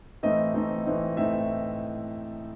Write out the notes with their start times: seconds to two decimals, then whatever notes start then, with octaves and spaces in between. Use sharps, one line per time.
0.23 A2 E3 A3 C4 D#4 D#5
0.54 A2 E3 A3 C4 D#4
0.86 A2 E3 A3 C4 D#4
1.17 A2 E3 A3 C4 D#4 E5